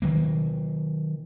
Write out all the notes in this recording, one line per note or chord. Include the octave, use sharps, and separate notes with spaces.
D#3 F#3 A#3